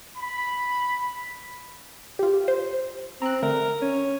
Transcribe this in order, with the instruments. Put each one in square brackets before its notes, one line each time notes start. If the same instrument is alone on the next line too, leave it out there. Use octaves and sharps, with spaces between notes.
[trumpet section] B5
[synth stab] F4 G4
C5
[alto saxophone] C4 [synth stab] A#5 F#6
[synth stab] D3 A3 [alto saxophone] A#4
[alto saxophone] C#4